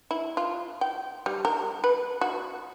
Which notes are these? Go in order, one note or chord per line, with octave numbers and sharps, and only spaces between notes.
E4
F4
G5
G3
A#4
B4
F#4